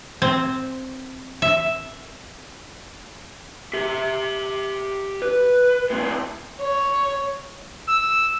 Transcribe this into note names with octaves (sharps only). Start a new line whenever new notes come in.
C4
E5
G4 E5
B4
A2 C4
C#5
E6